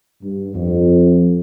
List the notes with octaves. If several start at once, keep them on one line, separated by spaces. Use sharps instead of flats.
G2
F2